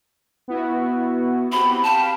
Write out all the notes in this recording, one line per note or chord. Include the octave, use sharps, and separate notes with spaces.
B3 E4 F#4
C4 F#4 G4 B5
F5 G5 A5 B5